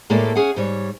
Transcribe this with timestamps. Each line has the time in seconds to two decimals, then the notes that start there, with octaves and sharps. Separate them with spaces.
0.10 A2 G#3 A#3 G4 A4 D5
0.35 C#4 G#4 F#5
0.56 G#2 G3 C#5